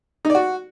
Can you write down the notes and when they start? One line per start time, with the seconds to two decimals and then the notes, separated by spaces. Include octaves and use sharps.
0.25 D#4
0.30 D5
0.35 F#4